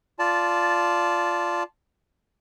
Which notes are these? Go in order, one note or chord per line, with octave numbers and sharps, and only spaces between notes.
F4 D5 A5